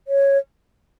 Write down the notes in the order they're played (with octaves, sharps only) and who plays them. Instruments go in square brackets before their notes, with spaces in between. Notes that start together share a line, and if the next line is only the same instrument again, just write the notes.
[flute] C#5